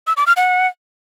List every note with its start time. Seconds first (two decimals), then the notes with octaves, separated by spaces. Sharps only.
0.07 E6
0.17 D6
0.27 F6
0.36 F#5